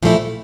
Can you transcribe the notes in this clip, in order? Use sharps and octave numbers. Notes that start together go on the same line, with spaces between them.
A#2 F3 A3 E4